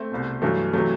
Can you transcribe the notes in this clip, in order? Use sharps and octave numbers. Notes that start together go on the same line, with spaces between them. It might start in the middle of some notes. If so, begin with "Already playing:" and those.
Already playing: A3 C4
C2 B2
G2 E3 F#3 A3
C3 E3 F#3 A3